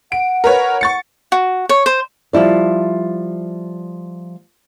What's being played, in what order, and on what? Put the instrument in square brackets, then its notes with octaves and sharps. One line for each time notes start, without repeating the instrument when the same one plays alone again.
[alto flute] F#5 [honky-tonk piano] D7
[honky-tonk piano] A#4 B4 C#5
C#6 A6 C#7
[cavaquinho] F#4
C#5
C5
[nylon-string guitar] F3 G3 E4 D5